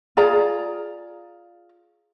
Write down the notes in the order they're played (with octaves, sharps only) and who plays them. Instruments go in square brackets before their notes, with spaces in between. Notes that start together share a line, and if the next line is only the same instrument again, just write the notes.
[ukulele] F4 G#4 D5 A#5